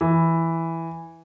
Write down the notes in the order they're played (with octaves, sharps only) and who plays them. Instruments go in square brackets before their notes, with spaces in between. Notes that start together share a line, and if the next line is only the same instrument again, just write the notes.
[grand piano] E3